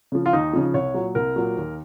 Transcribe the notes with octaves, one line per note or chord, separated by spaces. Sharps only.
C#3 F3
F4
D#2 D#4
C#3 F3
C2 C#5
A#2 F#3
C2 A#4
A#2 F#3
D#2